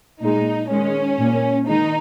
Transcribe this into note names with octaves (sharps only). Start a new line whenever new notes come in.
A#2 G#3 D#4
D#3 G#3 C#4
A#2 A#3
D#3 G#3 D#4